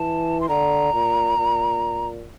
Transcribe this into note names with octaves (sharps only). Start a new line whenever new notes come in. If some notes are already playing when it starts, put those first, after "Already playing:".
Already playing: E3 A5
C6
D3 A#5
A#2
A#2